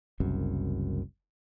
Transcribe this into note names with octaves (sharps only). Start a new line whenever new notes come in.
F#1 C2 F#2